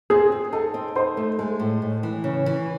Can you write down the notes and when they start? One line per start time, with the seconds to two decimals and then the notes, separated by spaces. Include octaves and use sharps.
0.10 C4 G#4
0.32 C4
0.53 D#4 A4
0.74 C4
0.95 D#4 C5
1.17 A3
1.38 G#3 A4
1.60 A2
1.82 A2
2.03 E3
2.24 C#3
2.46 E3